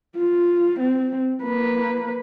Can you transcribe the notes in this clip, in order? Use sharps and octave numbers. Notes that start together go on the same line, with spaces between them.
F4
C4
A#3 B4